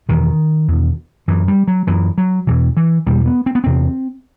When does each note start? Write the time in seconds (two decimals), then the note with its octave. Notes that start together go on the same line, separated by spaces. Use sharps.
0.09 E2 B2 D#3
0.68 E2 B2
1.28 F#2 E3
1.48 G3
1.68 F#3
1.87 F#2 E3
2.18 F#3
2.47 E2 B2 E3
2.77 E3
3.07 E2 B2 G3
3.26 B3
3.46 C4
3.55 B3
3.64 E2 C3 C4